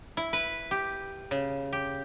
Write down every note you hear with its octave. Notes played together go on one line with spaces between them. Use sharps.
E4
B4
G4
C#3
G4